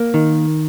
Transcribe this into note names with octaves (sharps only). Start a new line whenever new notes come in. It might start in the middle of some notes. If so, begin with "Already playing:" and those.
Already playing: A#3
D#3